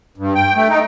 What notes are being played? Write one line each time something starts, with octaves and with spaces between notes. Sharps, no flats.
G2
G5
A3
D#4